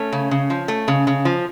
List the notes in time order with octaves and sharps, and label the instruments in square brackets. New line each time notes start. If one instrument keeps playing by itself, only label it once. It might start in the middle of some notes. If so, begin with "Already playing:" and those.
Already playing: [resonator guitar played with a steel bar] A3 C#4
C#3
C#3
F3
A3
C#3
C#3
F3